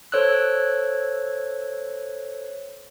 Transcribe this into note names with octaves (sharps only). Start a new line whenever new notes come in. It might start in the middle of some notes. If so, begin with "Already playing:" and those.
A4 C5 C#5 E6 F#6